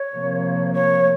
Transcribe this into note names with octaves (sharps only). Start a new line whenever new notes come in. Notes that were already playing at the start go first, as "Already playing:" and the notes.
Already playing: C#5
C3 F3 A#3
C#5